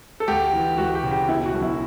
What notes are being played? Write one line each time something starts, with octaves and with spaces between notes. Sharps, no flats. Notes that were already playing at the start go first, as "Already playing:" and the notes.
A4
D2 G4
E3
D2 F#4
G4
C#3
G4
B2 E4
F#4
B1
E4